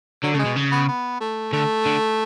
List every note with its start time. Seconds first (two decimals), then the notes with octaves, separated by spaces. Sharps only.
0.23 D3 F#3
0.34 C#3 A3
0.39 G#3
0.45 B2
0.56 C#3
0.72 B3
0.88 B3
1.20 A3
1.53 D3 A3
1.86 D3